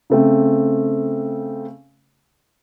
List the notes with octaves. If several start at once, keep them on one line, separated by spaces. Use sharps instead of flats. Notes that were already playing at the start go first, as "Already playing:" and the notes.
C#3 A3 C4